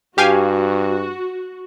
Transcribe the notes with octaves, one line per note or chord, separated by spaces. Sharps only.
G2 F#4 G4 F5 G#5